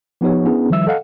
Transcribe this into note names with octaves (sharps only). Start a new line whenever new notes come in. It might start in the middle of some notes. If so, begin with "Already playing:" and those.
F3 B3 D#4 G4 C#5
B3 C#4 D4 E4 G#4
D#3 F3 G3 E5 E6
A4 D#5 F5 F#5